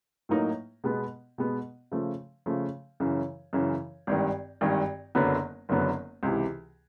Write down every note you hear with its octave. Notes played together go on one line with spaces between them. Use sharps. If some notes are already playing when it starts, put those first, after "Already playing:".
A2 F#3 A#3 D#4
B2 G#3 B3
B2 G#3 B3
C#3 F3 A3
C#3 F3 A3
F#2 C#3 E3
F#2 C#3 E3
G#1 G2 D#3
G#1 G2 D#3
F#1 F#2 D3 F#3 B3
F#1 F#2 D3 F#3 B3
C#2 C3 E3